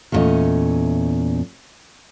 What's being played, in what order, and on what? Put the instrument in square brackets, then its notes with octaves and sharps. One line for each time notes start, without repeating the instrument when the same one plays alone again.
[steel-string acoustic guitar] E2 A#2 G3 A3 C#4 D#5